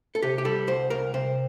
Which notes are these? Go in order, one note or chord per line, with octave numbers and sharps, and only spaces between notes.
A4
C3 G4
G4
G3 A4
C2 C5
C2 A#4
C3 C5